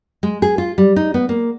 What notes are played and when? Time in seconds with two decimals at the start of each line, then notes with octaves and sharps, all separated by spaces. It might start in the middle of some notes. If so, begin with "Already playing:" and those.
0.23 G#3
0.42 G#4
0.58 F4
0.78 G3
0.96 D#4
1.14 B3
1.29 A#3